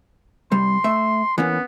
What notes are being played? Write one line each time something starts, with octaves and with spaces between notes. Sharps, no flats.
C2 G3 C6
A3 E5
E3 A#3 B3 C#4